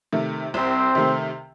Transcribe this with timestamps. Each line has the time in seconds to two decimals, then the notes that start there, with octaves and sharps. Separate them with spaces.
0.12 C3 D#3 A3
0.54 C2 C4
0.95 C3 D#3 A3